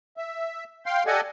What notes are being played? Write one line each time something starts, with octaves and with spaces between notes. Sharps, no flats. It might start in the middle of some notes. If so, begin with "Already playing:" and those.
E5
F5 G5 C6
G4 A4 D5 D#5 F#5 G#5